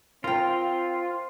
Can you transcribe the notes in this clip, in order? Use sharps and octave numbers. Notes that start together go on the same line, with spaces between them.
C4 F4 A#4 G5